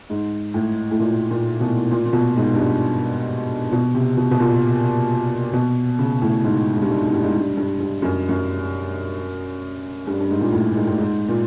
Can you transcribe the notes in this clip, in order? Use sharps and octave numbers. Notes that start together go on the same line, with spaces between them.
G#2
A2
A2
A#2
A#2
B2
A#2
A#2
B2
G#2
G2
G#2
B2
C3
B2
B2
A#2
B2
C#3
A2
G#2
G#2
G2
G#2
G#2
G2
G#2
G2
G2
G2
F#2
F#2
G2
G2
G#2
A#2
A2
G#2
A2
G#2
A#2